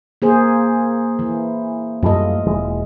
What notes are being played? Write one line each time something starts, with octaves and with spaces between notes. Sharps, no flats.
A#3 G#4 C5
E3
F#2 G3 A3 F4 D#5
E1 E3 G#3